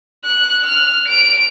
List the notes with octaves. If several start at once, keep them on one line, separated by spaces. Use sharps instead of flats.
F#6
F6
D7